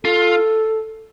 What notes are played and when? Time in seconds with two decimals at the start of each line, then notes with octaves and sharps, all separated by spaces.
0.05 F4 A4